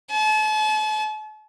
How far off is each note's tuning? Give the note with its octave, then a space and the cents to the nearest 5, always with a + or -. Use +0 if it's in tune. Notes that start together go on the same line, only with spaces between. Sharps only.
A5 -40